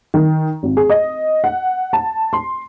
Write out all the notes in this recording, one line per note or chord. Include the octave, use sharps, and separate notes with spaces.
D#3
G#1
G#4
D#5
F#5
A5
C6